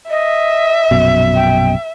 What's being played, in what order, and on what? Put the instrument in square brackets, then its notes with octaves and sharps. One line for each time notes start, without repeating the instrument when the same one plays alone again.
[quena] D#5 [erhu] E5
[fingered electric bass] A#1 F#2 B2
[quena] G5